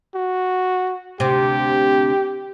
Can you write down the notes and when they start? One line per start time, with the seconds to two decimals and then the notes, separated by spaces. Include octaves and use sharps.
0.15 F#4
1.20 D2 C3 G4